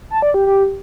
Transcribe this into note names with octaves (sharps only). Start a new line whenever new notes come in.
A5
D5
G4
G4